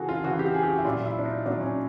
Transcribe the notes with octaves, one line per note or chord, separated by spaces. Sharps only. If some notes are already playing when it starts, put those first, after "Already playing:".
Already playing: C#3 E3 F#4 G#4 A4
F4
C#3 E3 F#4
G4
G#4
G4
F#4
E4
A#2 F#3 F4
E4
D4
D#4
A#2 F#3 D4
C#4